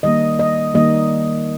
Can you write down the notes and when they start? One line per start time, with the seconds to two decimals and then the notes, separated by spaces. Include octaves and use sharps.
0.03 D#3 G3 A#3 D#5
0.39 D#5
0.74 D#3 G3 A#3 D#5